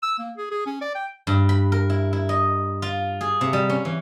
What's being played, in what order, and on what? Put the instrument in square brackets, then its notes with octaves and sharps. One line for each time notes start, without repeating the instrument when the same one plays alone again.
[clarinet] E6
A#3
G#4
G#4
C#4
D5
G5
[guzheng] G2
B5
A#4
E4
E4
D#5
F4
G#4
C3
G3
C#4
E3